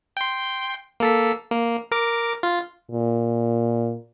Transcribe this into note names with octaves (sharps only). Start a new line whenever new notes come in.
G5 C6
A#3 A4 B6
A#3
A#4 D6
F4
A#2